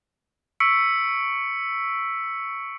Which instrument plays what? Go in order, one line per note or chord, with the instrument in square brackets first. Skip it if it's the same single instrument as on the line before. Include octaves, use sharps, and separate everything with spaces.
[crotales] C#6 E6 B6 C#7 D7